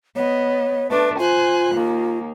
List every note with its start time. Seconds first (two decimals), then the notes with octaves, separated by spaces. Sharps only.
0.16 B3 C#5 D#5
0.90 A3 D4 B4
1.19 F4 C5 G#5 F#6
1.75 D#2 A#3